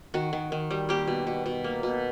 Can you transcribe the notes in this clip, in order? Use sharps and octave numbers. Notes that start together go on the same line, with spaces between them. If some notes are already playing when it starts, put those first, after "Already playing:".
D#3 F#4
D#3
D#3
G3
A#3 G4
B2
B2
B2
A#3
B2